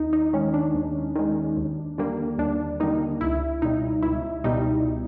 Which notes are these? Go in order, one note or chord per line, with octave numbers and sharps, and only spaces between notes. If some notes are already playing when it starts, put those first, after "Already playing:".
Already playing: D#2 D#4
D#4
D#3 G#3 C#4
D4
D#2
D#3 G#3
D#2
D3 G3 A#3
D#2 D4
D3 G3 A#3 D#4
C#2 E4
B2 G3 D#4
C#2 E4
B2 G3 D#4